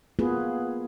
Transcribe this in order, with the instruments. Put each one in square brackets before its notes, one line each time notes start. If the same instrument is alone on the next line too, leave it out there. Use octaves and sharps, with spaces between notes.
[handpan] A#3 B3 F4 F#4 G#4 B4